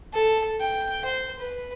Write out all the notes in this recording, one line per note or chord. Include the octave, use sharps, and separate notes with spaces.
A4
G5
C5
B4